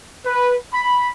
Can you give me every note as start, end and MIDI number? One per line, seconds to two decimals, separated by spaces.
0.25 0.56 71
0.74 1.10 83